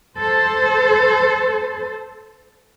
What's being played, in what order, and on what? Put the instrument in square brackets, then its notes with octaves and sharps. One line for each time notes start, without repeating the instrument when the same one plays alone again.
[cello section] A4 C5